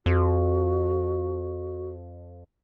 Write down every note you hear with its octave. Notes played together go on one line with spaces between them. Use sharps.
F2 F#4